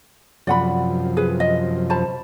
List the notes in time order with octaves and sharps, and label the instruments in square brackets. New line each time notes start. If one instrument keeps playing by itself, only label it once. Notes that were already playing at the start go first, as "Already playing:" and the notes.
[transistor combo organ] F#2 C3 F3 [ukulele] D5 F#5 B5
[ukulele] G#4 B4
D#5
C5 A5 B5